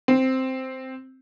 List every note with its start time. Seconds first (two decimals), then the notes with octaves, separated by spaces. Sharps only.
0.08 C4